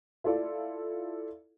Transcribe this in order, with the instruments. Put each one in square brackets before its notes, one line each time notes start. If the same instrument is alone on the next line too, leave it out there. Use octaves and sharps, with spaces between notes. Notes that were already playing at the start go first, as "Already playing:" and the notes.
[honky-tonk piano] E4 F4 A4 D5